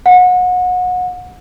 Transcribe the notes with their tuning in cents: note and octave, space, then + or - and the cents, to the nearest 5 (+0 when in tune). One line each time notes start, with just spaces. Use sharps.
F#5 -30